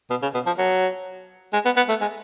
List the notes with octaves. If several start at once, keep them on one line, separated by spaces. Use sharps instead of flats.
B2
C#3
B2
F3
F#3
G#3
B3
B3
A3
G#3